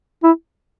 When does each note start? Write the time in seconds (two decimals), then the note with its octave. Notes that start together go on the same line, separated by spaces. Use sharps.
0.23 E4